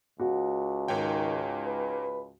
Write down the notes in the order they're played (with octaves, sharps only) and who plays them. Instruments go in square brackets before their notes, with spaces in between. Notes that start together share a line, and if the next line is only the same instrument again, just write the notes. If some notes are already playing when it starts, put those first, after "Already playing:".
[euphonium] C#2 [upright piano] F#4
[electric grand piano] G#2 C#5 G5 [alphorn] D#3
[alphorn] B4